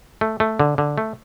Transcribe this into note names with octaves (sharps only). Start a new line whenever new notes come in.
A3
A3
D3
D3
A3